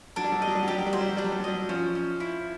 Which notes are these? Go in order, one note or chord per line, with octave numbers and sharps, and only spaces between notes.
F#3 D4
G3
F#3
G3 D#5
F#3
G3
F#3
G3 G4
F#3
G3
F#3 C5
G3
F#3
G3 D4
F#3
G3
F#3
G3 D#5
F#3
F3 C#4
C#4
E4